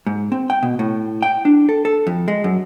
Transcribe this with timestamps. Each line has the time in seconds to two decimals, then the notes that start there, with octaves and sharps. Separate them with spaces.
0.07 G#2
0.32 C4
0.50 G5
0.63 B2
0.79 A2
1.22 G5
1.45 D4
1.69 A4
1.85 A4
2.07 F2
2.28 G#3
2.44 F#2